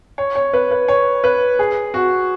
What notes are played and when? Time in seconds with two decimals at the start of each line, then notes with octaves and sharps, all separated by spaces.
0.18 C#5
0.35 C#5
0.53 B4
0.71 B4
0.88 C#5
1.24 B4
1.59 G#4
1.94 F#4